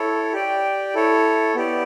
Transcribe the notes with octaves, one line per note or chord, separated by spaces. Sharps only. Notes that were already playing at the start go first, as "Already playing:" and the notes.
Already playing: E4 A4 C#5
G4 D5 G5
E4 A4 C#5
B3 E4 G4 D5